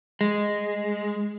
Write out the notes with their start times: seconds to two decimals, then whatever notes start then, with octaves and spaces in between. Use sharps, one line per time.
0.21 G#3